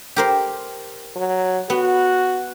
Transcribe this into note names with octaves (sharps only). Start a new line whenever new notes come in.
G4 A#4 C5
F#3
B3 F#4